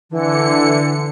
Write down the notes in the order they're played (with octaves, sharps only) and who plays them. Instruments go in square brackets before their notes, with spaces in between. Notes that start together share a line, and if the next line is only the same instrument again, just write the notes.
[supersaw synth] D3 C#7 [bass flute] E3